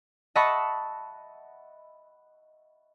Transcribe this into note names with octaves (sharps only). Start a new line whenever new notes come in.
D#5 E5 F#5 A5 B5 C#6